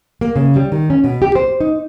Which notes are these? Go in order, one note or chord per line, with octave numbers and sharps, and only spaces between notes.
A#3
C#3
G3
D#3
C#4
B2
G4
C5
D#4